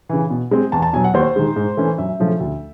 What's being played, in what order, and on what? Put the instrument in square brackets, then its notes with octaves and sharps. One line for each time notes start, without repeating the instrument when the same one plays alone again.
[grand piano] C#3 E3
B2
G#3 C4
E2 A5
A5
B2 F#3 G#5
F#5
D#2 C5
D#3 G#3
G#2
E3 A3 C#4
F#2 E5
C#3 F3 A3 C#4
D2